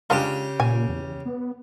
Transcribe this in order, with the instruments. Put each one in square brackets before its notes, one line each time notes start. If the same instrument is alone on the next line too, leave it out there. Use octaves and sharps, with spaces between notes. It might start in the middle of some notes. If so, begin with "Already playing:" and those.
[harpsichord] C#3 G4 [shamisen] G#3 D4 F4
[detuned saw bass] A#2 [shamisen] G#5
[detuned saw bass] E2
B3